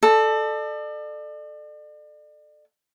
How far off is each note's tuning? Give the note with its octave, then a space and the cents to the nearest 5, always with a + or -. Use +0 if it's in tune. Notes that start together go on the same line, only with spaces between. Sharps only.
A4 -5 D5 +40